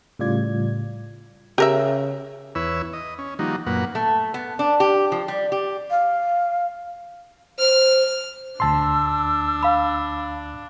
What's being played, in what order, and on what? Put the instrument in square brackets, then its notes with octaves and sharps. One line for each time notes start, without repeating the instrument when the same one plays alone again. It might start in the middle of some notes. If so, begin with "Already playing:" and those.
[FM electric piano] A2 C#3 G3 F4 D5 G#6
[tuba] C#3 [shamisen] G4 A#4 E5
[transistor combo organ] E2 E4 B4 C#5 E6
D#5
C#4
D#3 F3 G3 A#3 D#4 F#4
F#2 A#2 A#3 B4 F#5
[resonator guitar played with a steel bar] A3
B3
D4
G4
F3
G3
G4
[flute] F5
[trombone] C5 [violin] F6
[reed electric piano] D2 A5 C6 [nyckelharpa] D4 [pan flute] E6
[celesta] F5 B5